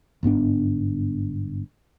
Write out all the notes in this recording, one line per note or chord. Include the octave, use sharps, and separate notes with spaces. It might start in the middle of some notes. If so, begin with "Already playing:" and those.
G1 G#2 B3 D4